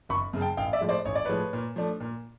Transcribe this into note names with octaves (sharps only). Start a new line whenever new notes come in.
F#1 B5 C#6
F#2 C#3
G5 A5
A1 F5 G5
D5 E5
A2 F3 G#3
C5 D5
A1 C#5
D5
A2 F3 G#3 B4 C#5
A#2
F3 A3 D4
A#2